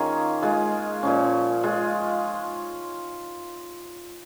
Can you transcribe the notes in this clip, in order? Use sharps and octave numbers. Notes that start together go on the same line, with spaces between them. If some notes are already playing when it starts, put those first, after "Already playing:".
Already playing: D#3 A#3 C#4 F4 G#4 A#4
G#3 F4 G#4
A#2 F3 C#4
G#3 F4 G#4